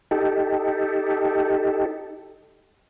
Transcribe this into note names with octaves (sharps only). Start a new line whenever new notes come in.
D#4 G4 A4